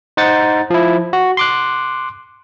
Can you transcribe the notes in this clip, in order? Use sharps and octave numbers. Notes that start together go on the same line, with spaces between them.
D#4 C5 F#5 A6
F3 E4
F#4
C6 D6 F#6